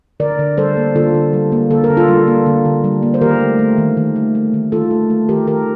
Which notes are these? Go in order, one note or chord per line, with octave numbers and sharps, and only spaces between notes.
D3 A#4 D5
D3
G3 A4 C5
A#3
D3 F4 A4
D3
G3
A#3
D3 A4
A#4
D3
F4 A4
G3
A#3
D3
D3
G3
A#3
C5
D#3 G4 A#4
A3
A3
D#3
D#3
A3
A3
D#3
D#3 F4 A4
A3
A3
D#3 G4 A#4
D#3 G4 A#4